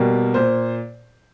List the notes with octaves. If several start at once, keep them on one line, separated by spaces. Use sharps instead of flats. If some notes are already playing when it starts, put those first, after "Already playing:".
Already playing: B2 G3 A#3
A#2 C5